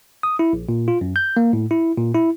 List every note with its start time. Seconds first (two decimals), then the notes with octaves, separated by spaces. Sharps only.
0.23 D#6
0.39 E4
0.53 A#1
0.69 A#2
0.88 F4
1.01 F#2
1.16 G6
1.37 A#3
1.53 A2
1.71 E4
1.98 A#2
2.14 E4